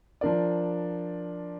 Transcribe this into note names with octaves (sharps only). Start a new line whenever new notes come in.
F3 D4 A#4 D5